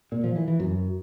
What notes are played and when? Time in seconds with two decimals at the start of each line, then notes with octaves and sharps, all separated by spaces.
0.12 A#2
0.24 F3
0.36 E3
0.48 E3
0.60 F#2